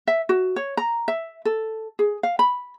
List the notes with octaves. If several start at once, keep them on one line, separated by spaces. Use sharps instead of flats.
E5
F#4
C#5
A#5
E5
A4
G#4
F5
B5